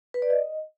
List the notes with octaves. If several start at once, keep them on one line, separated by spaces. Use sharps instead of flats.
B4
D5
D#5